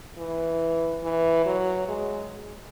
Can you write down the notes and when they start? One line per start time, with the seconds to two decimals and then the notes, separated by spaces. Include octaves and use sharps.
0.18 E3
1.04 E3
1.46 F#3
1.88 G#3